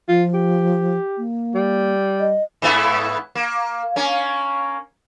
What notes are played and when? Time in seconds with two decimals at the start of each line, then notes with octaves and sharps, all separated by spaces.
0.09 F3 F4
0.34 G4
1.18 A#3
1.55 G3
2.20 D#5
2.62 G#2 B3 E4
3.35 A#3
3.96 A#3 C#4